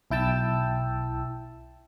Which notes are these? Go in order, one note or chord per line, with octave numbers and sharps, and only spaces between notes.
B1 E4 G5 A5 E6